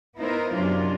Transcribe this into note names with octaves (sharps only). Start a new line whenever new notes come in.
B3 D#4 E4 A#4 C5
F#2 C3 F#3 C#4 D4 F4